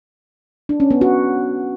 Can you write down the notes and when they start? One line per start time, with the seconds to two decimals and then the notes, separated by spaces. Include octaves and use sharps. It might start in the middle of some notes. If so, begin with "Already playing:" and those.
0.69 D4
0.80 C#4
0.91 B3
1.01 F#4